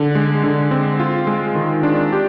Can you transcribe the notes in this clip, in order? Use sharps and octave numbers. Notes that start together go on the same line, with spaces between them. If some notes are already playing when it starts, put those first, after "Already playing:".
Already playing: D3
G#3
D3
C4
F4
G#3
D#3
D4
G4